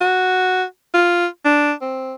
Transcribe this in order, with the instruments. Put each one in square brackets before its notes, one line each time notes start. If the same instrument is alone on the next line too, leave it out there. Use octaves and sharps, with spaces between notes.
[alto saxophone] F#4
F4
D4
C4